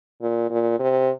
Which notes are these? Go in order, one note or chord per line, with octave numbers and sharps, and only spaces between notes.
A#2
A#2
C3